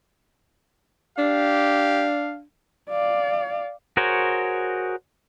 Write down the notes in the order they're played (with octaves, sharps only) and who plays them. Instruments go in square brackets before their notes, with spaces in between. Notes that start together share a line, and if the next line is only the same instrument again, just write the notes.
[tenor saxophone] D4 [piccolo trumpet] G4 [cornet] F5
[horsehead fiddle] D5 F5
[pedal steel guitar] F#4 G#4 A#4 C5 C#5